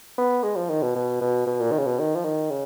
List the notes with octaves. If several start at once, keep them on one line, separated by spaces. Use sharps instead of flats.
B3
G#3
F3
D#3
B2
B2
B2
B2
A#2
D#3
C#3
B2
D#3
F3
D#3
C#3